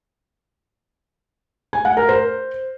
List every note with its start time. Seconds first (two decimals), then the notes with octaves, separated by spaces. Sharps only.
1.73 G#5
1.85 F#5
1.97 A#4
2.09 C5